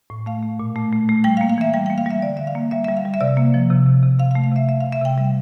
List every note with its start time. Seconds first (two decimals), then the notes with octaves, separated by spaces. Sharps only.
0.10 A2
0.26 A3 F5
0.43 A3
0.60 A#2
0.76 A3
0.93 A3
1.09 A3
1.24 G3 G5
1.37 F5
1.41 A#3
1.49 F5
1.58 E3 E5
1.74 G3 G5
1.86 G5
1.90 A#3
1.98 F5
2.06 G3 E5
2.22 D3 D5
2.37 D3 E5
2.47 F5
2.55 A#3
2.71 G3 E5
2.84 E5
2.88 G3
2.97 F5
3.05 G3
3.14 E5
3.21 C3 D5
3.37 A#3
3.54 F3
3.70 C3
3.86 C3
4.03 C3
4.19 C3 F5
4.31 F5
4.35 A3
4.44 F5
4.51 C3 E5
4.68 C3 E5
4.80 C3 F5
4.92 E5
5.01 C3 G5
5.18 G3